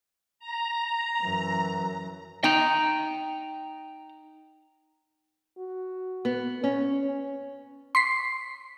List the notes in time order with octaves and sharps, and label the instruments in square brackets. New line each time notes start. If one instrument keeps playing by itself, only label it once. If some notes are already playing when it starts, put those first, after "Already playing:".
[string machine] A#5
[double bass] F#2 E3
[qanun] D#4 [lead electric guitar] G5 A#5
[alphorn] F#4
[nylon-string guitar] B3
[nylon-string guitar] C#4 [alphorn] C#5
[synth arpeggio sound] C6 B6 C7